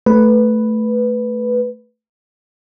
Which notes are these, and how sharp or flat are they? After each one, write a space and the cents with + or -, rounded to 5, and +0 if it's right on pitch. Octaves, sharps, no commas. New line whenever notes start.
A3 +0 B4 +0